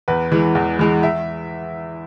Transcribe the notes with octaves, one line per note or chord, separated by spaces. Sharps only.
E2 B4
E3 G#3
E2
E3 G#3
E5